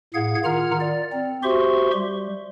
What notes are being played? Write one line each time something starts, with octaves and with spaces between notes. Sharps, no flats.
A2 G#4 F5 F#5 G#6
D#3 F4 F#5 A#5 F6
D5
C4
F#4 G4 C5 E5 C6 C#6
G3